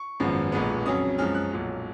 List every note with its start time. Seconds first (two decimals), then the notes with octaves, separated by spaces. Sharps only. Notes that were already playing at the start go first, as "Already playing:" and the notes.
Already playing: C#6
0.20 G#1 F#2 F3 G#3 B3
0.52 B1 A#2 G#3 B3
0.85 F2 C#3 F#3 C#4 D#6
1.18 F#2 F3 G#3 C#4 F6
1.35 F#6
1.51 B1 A#2 F#3